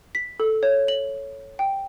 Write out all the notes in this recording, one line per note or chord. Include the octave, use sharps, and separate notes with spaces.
B6
A4
C#5
F#7
G5